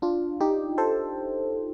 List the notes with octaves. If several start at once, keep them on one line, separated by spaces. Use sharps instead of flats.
D4 F4
D#4 G4
A4 C5